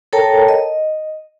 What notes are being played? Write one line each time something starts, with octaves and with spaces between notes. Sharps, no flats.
A4 A#4 C#5 G5 A5 A#5
D#5